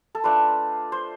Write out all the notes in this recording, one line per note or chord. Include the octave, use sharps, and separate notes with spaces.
A4
A3 D4 F4 B4
C5